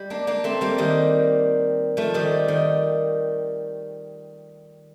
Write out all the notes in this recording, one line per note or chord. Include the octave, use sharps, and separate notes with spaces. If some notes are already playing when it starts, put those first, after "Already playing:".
Already playing: G3
A#3 D4
A#3 D4
A3 C4
G3 A#3
D#3 G3
F3 A3
D#3 G3
D#3